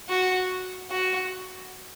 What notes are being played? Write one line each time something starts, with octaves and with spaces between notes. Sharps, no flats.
F#4
F#4